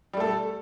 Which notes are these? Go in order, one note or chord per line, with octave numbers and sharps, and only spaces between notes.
G3 A3 A4